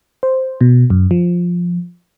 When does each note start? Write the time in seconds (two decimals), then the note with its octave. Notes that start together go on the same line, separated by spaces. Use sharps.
0.23 C5
0.61 B2
0.90 F#2
1.11 F3